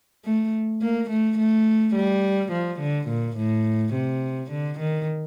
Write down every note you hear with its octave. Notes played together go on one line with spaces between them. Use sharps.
A3
A#3
A3
A3
G3
F3
D3
A#2
A2
C3
D3
D#3